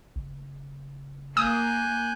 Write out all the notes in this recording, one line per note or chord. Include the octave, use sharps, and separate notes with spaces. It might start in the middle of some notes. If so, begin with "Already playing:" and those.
F#1
A#3 G#5 D#6 F#6 G6